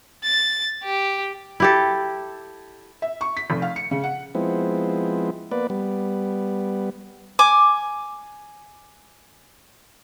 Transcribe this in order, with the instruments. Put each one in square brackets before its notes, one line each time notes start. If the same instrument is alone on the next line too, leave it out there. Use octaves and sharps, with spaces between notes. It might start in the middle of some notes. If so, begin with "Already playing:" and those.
[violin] A6
G4
[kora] E4 G4 A4
[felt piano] E5
C#6
B6
F1
F5
C#7
C#3
F#5
[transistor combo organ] F3 G#3 B3 C4 E4
A#3 B3 B4 D5
G3 B3
[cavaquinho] G#5 D6